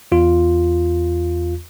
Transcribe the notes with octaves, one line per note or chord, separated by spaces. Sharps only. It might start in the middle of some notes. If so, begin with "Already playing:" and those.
E2 F4